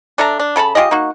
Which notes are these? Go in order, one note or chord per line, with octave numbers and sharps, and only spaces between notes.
D4 A4 E5 A#5
D4
C#3 A4 A5 B5
F4 G4 G#4 D#5
A#3 D#4 F#4